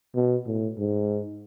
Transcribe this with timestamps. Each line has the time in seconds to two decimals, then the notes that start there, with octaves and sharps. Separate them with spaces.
0.15 B2
0.46 A2
0.78 G#2